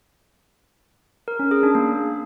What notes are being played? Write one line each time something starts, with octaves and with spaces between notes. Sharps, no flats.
A#4
C#4
G#4
D4
A#3